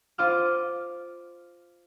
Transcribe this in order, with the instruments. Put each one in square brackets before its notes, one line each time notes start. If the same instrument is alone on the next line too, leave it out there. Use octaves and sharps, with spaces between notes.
[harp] F4 C5 D#5 F5 D6 F6